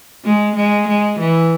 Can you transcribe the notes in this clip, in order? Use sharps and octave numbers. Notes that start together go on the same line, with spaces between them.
G#3
G#3
G#3
E3